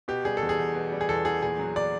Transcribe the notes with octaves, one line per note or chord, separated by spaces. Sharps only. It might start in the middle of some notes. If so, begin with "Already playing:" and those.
B2 G4
G3 G#4
A4
E2
G#4
E2
B2
G3
G#4
E2 A4
E2 G#4
A#2 G#4
F#3
D5